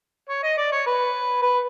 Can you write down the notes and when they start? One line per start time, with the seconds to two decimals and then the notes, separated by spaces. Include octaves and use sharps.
0.29 C#5
0.43 D#5
0.58 D5
0.72 C#5
0.86 B4
1.42 B4